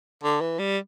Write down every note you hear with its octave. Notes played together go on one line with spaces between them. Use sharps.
D3
E3
G3